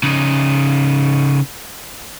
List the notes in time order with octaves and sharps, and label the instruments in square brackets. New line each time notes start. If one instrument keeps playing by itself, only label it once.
[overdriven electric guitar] C#3 D#4